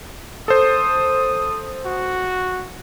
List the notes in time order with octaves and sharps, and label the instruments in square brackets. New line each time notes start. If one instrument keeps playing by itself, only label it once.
[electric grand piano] A4 C5 [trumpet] D#6
[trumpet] F#4